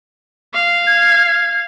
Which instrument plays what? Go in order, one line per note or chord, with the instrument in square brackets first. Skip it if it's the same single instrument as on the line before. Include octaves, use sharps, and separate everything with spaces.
[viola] F5
[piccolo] G#6
G#6